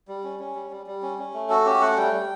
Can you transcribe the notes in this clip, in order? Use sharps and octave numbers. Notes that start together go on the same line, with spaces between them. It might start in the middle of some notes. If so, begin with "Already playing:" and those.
G3
C#4
C#4
G3
G3
G3
C#4
C#4
A3
F#4 A4
C#4 G4
A3 F#5
G3 G5
G3